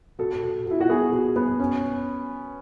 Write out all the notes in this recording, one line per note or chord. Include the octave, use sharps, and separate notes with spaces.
B2 A4
B2
B2 E4
F#4
B3 G#4
B2
B3
C#4